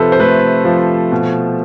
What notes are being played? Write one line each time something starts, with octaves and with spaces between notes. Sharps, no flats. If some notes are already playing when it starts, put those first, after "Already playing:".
Already playing: C3 F3 A4 B4 C5
C5
A3 B4
F3
B2